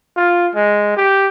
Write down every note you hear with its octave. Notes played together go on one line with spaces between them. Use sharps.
F4
G#3
G4